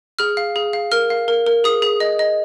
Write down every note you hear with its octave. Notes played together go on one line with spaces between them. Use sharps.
G#4 F6
F5
G#4
F5
A#4 F6
F5
A#4
A#4
G#4 D#6
G#4
D#5
D#5